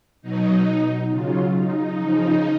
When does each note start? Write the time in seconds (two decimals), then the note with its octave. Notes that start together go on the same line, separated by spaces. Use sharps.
0.22 B2 F#3 D#4
1.10 C#3 F#3 F4
1.55 D#4
1.98 C#3 F3